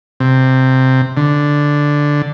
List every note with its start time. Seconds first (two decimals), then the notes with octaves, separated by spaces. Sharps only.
0.20 C3
1.17 D3